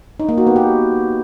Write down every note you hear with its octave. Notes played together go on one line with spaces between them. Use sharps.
D#4
A#3
F#4
B3
G4